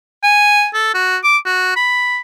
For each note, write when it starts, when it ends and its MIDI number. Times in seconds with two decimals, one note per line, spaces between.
0.24 0.68 80
0.74 0.94 69
0.94 1.17 66
1.24 1.37 86
1.46 1.75 66
1.76 2.20 83